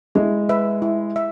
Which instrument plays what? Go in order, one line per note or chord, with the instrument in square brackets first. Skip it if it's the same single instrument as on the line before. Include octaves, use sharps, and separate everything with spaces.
[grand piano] G#3 [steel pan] E4
[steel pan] B4 E5
E4
E5